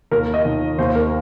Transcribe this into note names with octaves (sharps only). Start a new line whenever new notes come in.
D#2 A#4
D#5
D#3
D#2 C5
A#4